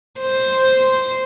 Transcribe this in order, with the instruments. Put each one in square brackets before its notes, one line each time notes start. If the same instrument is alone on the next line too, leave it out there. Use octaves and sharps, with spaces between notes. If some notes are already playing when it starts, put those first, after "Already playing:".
[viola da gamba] C5